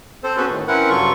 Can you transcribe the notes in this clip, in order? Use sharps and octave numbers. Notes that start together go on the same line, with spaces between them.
C4 A4 C5
B3 C#4 F#4 G#4 A4 B4
A2 D#3
C4 C#4 E4 A#4 B4 F#5
G2 C#3 F#3 F4 A4 C#6